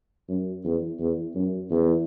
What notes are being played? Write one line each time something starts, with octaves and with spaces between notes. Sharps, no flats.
F#2
E2
E2
F#2
E2